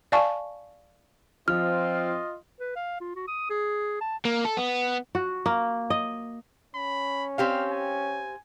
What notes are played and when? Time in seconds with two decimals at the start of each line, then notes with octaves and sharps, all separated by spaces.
0.12 D5 F5 G#5 A5 C#6
1.48 F3 C4 F4 D#5 F6
2.60 B4
2.76 F5
3.00 F4
3.15 F#4
3.28 D#6
3.50 G#4
4.01 A5
4.25 A#3
4.45 A4
4.57 B3
5.15 F#4
5.46 A#3
5.90 D#5
6.75 C#4 B5
7.38 C4 G4 F5 F6
7.71 G#5